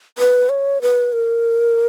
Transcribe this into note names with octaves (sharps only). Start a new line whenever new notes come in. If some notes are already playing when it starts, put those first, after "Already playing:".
B4
C#5
B4
A#4